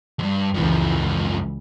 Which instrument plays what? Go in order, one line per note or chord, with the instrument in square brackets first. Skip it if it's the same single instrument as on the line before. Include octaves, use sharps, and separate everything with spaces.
[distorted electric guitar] E2 G2
[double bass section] C#2 E3 [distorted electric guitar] F#2 F3